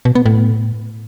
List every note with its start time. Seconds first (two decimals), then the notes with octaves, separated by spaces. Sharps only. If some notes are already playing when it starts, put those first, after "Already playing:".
0.05 B2
0.15 B3
0.26 A2